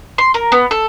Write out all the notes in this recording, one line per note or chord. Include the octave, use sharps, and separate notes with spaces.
C6
A#4
B3
A4